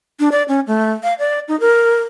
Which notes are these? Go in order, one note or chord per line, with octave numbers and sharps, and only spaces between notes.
D4
D5
C#4
A3
F5
D5
D#4
A#4